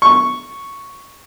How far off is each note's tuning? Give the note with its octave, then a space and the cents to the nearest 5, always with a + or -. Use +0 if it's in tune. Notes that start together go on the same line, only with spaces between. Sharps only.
C#6 +0